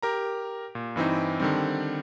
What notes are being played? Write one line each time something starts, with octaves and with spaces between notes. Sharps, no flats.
G4 A#4 A#5
A#2
G2 E3 C4 D#4
D3 D#3 G3 C4